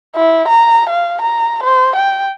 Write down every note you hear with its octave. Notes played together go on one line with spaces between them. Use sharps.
E4
A#5
F5
A#5
C5
G5